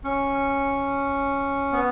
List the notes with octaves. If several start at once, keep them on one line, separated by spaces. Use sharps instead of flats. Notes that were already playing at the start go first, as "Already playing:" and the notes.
C#4
B3